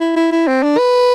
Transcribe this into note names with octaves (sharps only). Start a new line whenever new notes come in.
E4
E4
E4
C4
D4
B4